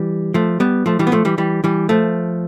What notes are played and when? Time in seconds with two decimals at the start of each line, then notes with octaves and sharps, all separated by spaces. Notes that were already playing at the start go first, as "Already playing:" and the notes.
Already playing: E3 G3
0.34 F3 A3
0.60 G3 B3
0.86 F3 A3
0.99 E3 G3
1.07 B3
1.12 F3 A3
1.25 E3 G3
1.38 E3 G3
1.64 E3 G3
1.89 F3 A3